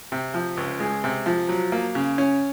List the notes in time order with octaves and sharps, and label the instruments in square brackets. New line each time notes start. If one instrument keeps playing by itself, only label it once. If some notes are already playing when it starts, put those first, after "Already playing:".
[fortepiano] C3
F3
C#2
G#3
C3
F3
F#3
A#3
C#3
C#4